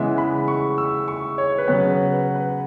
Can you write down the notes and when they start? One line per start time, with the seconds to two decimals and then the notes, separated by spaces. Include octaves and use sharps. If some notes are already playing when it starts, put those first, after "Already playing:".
Already playing: C#3 E3 G#3 B3 E5
0.18 B5
0.48 C#6
0.78 E6
1.08 C#6
1.38 C#5
1.58 B4
1.67 C#3 F#3 B3 C#5
1.90 B4
2.13 B4
2.35 B4